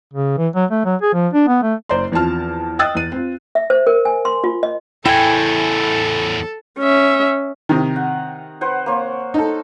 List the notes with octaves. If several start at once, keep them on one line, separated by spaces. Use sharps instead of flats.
C#3
E3
F#3
A3
F#3
G#4
F3
D4
B3
A3
F#1 C5 D5 A#5 C6
E2 F3 C4 A5 F6
D#5 G5 D#6 E6 F#6 A6
E2 D#7
C4 F4
E5
C5
A#4
G#5
C6
F4
D#5
E2 A2 E4 A4 G5 G#5
C#4 E5
C3 D#3 A#5 D#6
F#5
B4 C5 F#5
A#3 C5 C#5
D#4 A4